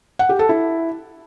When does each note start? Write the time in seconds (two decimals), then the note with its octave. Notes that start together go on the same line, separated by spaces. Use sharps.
0.19 F#5
0.29 G4
0.39 A4
0.49 E4